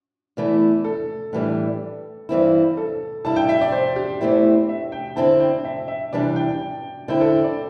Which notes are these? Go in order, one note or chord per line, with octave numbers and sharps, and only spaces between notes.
E2 E3 A3 E4
A4
A2 E3 G3 D4
G2 E3 C4 E4
A4
G2 G3 E4 A5
G5
E5
D5
C5
G4
E2 E3 A3 C4 E4
E5
G5
D3 C4 E4 A5
G5
E5
E5
C3 E3 G3 D4 D5
G5
D3 C4 E4 G5
A4
D5